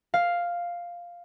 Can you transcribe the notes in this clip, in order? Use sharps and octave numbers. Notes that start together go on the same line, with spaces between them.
F5